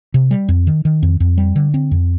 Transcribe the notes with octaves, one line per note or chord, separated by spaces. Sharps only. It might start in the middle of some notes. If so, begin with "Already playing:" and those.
C3
G3
F2
D#3
D#3
F2
F2
G3
D3
C4
F2